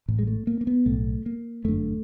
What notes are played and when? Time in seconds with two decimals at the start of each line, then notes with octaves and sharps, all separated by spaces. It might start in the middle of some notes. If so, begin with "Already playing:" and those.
0.08 A1 A2
0.19 G#3
0.27 A3
0.47 A#3
0.61 A#3
0.67 B3
0.86 B1 A2 A3
1.26 A#3
1.65 G1 F#2 D3 A3